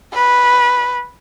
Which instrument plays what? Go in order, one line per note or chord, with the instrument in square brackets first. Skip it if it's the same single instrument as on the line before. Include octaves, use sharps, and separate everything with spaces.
[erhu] B4